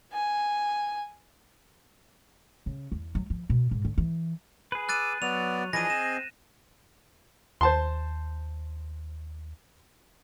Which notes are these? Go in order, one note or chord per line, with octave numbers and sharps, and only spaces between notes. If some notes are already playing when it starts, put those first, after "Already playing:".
G#5
C#3
E2
F#3
F3
B2
G#2
D3
E3
G#4 B4
D6 E6 F#6 A6 D#7
F#3 B3 D5 F7
E3 F3 D4 G#4 D#5 G#5 A#6 D#7
C4 E7
D#2 C5 A5 C6